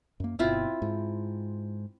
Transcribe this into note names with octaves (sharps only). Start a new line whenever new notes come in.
F#2 A#3
G1 B2 C4 E4 F4
G#2